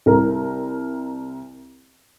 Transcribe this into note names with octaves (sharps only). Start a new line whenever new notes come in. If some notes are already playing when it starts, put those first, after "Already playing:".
C2 A#4